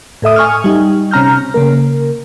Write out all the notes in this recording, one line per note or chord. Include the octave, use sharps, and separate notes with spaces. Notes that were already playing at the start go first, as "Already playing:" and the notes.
A2 A4 E5 D#6
G#5 C#6 D#6 F6
G3 D#4
C3 C#4 A#5 F6 G6
C#3 A#3 A#4